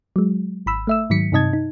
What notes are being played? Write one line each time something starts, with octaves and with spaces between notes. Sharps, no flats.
F#3 G#3
G#1 B5 E6
A3 E5 E6
G#2 D#3 F#3 B6 C#7
G2 C3 D#4 D#5 A5 G#6
D#4